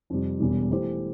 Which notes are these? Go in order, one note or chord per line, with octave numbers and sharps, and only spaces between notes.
F2 C3 G3
E1 E2 B2 G3
E3 A3 E4 G4 C5